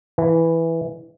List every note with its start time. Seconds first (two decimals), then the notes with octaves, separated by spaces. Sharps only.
0.18 E3